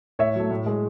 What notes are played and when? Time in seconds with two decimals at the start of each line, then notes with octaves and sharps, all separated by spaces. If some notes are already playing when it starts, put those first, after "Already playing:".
0.19 A2 C#5 E5
0.35 F#3 A3
0.51 A2
0.66 G#3